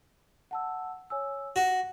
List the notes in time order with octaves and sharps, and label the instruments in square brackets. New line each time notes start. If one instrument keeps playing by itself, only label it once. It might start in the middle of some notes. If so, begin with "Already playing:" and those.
[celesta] F#5 A5 E6
C#5 G#5 E6
[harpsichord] F#4 [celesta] A#6